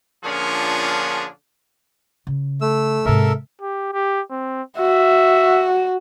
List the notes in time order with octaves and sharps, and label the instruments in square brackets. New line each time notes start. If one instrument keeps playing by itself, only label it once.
[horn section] A#2 D3 F3 C#4 D4 G#4
[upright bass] C#3
[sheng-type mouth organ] A3 E6
[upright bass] G#2 C3 [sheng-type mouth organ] A4 A#4 E5
[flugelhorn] G4
G4
C4
[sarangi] F#4 [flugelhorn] E5